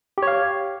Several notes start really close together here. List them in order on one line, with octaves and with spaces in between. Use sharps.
G4 C#5 F5